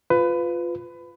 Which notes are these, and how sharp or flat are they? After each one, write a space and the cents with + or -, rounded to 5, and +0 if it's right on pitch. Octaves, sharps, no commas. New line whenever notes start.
F4 +0 B4 +20